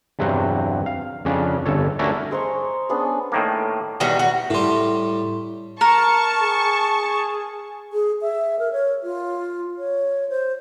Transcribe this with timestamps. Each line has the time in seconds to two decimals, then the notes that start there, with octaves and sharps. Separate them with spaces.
0.19 E2 G2 C3 F#3 C5 F#5
0.86 F5
1.25 F2 C#3 C#4 D4
1.66 G1 A4 C#5
1.99 A3 C#4 D4 E4 F#4 A#4
2.31 G#3 C5 A#5 C#6
2.89 B3 C#4 D4 G#4
3.32 A2 D#3 A#3
4.00 E2 D#3 G3 F#4
4.19 F#4
4.50 A2 G3 E4 C6
5.81 A#4 A5 C#6
6.41 G#4
7.93 G#4
8.22 E5
8.59 A#4
8.72 C#5
9.03 F4
9.78 C#5
10.29 C5